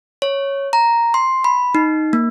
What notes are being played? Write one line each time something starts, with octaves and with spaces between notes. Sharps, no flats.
C#5
A#5
C6
B5
D#4
A#3